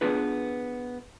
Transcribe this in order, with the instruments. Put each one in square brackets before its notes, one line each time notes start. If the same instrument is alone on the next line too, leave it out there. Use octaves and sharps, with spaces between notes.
[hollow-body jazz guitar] B3 D4 F4 G#4 B4